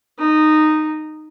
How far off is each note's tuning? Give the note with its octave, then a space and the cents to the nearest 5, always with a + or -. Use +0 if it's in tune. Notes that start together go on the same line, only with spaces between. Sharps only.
D#4 -10